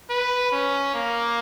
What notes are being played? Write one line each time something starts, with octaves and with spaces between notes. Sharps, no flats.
B4
C#4
A#3